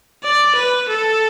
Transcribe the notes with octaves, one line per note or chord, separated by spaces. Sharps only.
D5
B4
A4